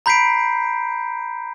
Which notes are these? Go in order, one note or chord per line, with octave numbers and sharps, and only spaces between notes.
A#5 B5 G6 B6 C7 D7